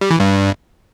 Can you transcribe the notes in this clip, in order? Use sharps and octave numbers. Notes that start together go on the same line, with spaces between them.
G3
E3
G2